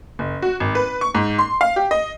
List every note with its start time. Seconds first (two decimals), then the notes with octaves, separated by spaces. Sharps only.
0.19 F#1
0.42 F#4
0.60 G#1
0.75 B4
1.01 C#6
1.14 G#2
1.39 C6
1.61 F5
1.76 G4
1.91 D#5